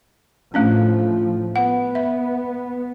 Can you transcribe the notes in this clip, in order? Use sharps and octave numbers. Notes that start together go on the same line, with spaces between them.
A2 F3 A3 C#4 D4
B3 F#5
E5